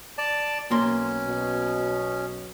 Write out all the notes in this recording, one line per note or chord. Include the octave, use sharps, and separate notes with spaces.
D5 A5
B1 A#3 C#4 C6
B2